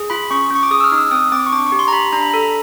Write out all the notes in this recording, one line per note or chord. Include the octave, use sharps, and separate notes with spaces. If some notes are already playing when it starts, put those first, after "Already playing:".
Already playing: G#4
F4 B5
C#4 C#6
C#4 C#6
D6
G#4 D#6
E6
F6
D#4
E6
C4 D#6
C4 D6
C#6
D4 D6
C#6
G4
C6
A#5
G4 B5
D4 A#5
B5
A4 A#5